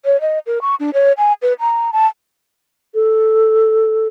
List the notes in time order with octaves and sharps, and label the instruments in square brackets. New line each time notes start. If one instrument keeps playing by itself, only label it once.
[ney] C#5
D#5
A#4
C#6
D4
C#5
G#5
B4
A#5
A5
[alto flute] A4